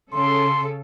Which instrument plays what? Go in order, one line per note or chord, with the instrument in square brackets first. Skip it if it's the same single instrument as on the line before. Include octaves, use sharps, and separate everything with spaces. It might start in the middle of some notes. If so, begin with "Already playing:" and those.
[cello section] C#3 A4 [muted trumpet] C6